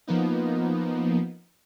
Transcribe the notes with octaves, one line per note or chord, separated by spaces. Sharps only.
F3 A#3 B3 D#4